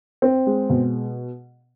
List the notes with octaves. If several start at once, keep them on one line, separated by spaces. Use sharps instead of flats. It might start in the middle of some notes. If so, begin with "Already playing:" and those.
C4
G#3
B2